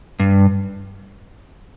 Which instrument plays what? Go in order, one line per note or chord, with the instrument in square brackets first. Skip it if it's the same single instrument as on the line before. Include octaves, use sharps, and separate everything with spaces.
[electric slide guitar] G2